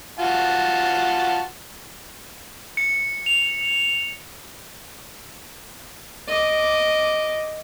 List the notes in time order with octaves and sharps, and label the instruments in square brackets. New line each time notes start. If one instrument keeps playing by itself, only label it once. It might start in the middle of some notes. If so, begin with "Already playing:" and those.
[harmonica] F4 F#4 A5
[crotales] C#7
F7
[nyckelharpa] D#5 D6